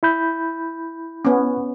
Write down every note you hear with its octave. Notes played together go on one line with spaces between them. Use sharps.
E4 B5 G6
B3 C#4